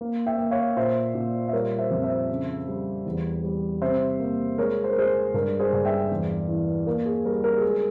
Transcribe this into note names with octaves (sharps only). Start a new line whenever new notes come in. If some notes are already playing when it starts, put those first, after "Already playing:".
A#3
E5 G5
A#3
C#5 F5
A#2 C5 E5
A#2
E5
G3 A#4 C#5
C5 E5
F2
C5 E5
C#3
G3
E2
G3
C3 C5 E5
A#3
G#3 A#4 C#5
C5
A#4
G#3 G#4 C5
G2 A#4
G#4 C5
G2
E5 G5
E2
E3
A#3 A#4
G#4
G3 A#4
A#4
G#4
G#3
A#4